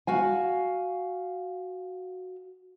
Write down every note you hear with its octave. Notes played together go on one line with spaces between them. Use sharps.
F#4 F5 G#5